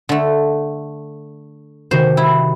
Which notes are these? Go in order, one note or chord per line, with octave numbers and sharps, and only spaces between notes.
D3 A3
C3 D#3 F#4 C5
E4